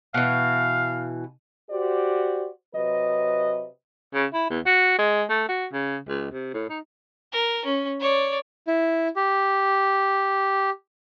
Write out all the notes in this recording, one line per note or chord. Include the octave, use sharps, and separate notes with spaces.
B2 E3 F5
F#4 G4 C5 D5
C3 F#3 B4 D#5
C#3
E4
E2
F#4
G#3
A3
F#4
C#3
C#2
C3
A2
D#4
A#4
C#4
C#5 D5
E4
G4